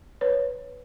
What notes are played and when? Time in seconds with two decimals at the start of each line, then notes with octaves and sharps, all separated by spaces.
0.21 B4 C#5